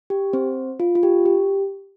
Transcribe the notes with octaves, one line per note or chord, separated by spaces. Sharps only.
G4
C4 C5
F4
F4
G4
G4